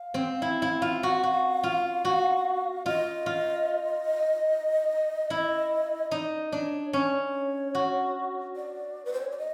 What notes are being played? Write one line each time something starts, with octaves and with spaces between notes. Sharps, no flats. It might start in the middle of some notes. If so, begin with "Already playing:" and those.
Already playing: F5
C4
E4
E4
F4
F#4
F#4
F4
F#4
F4 D#5
F4
E4
D#4 D5
D4 C#5
C#4 C#5
F#4
D5
B4
C5
C#5
D5
D#5